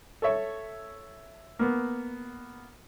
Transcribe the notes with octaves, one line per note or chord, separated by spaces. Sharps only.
A4 C#5 E5
A#3 B3